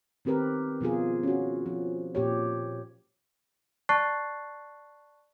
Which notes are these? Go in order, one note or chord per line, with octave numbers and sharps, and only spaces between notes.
D#3 C4 G4 A#4 B4
B2 F3 F4 G#4
C#4 F#4
F3
A#2 G4 C#5
D5 A5 C#6 F#6 A6 C7